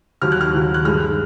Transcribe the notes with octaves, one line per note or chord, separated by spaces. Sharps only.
D#2 D#3 F#3 F6
F#6
F6
D#2 D#3 F#3
F#6
G2 D#3 G#3 F6